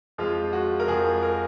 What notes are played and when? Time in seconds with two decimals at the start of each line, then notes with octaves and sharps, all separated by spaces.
0.18 F2 F3 G#3 F4
0.53 F#4
0.80 A#4
0.87 F2 F3 G#3 G#4
1.23 A#4